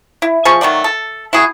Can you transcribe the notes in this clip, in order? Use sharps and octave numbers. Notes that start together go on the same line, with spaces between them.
E4
F3 G#4 C#6
D#3 F#3 A3 D5
A4
E4 F#4 G#4